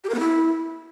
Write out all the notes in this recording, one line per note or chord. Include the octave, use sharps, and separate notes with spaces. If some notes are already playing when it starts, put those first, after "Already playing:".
G4
A#4
B3
E4